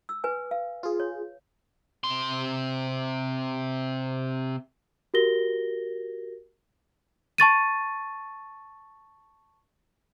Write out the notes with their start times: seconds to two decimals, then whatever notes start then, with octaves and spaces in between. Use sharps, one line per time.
0.09 E6
0.24 B4 G#5
0.51 F5
0.83 F4 G#4
1.00 C#5
2.04 C3 C6
5.14 F#4 G4 A#4 A#6 G7
7.38 A5 C#6 A6 D#7